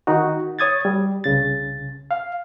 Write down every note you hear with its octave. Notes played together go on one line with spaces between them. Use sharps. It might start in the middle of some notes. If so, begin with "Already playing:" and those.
D#3 D#4 F#4
C#5 D#6 G#6 A6
G3
C2 C#3 A6
F5